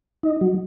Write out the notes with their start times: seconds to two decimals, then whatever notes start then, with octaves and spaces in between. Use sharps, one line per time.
0.23 D#4
0.41 F#3